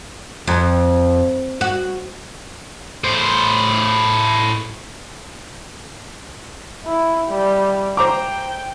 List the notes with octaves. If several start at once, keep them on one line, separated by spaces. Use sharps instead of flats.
F2
F#4
A2 C5
E4
G3
C5 G5 A#5 D6